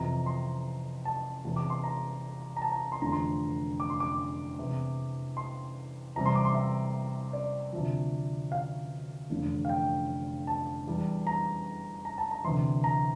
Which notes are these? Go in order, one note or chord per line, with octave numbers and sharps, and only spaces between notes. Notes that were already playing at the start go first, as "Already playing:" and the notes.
Already playing: F2 C3 E3 A#5
C6
A5
E1 E2 C3
D6
C6
A#5
A#5
A5
A#5
C6
F1 E2 D3 F3 A#5
C6
D6
C6
D6
E2 C3 E3
C6
E2 C3 G3 C4 A#5
C6
D6
C6
E5
D5
D2 C3 F3
F5
F1 E2 D3
F5
G5
A5
E2 E3 G3
A#5
A#5
A5
A#5
D2 C3 E3 C6
A#5